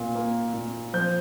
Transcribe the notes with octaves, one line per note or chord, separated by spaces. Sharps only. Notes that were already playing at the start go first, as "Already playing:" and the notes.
Already playing: A#2
A#3
A#2
F3 G6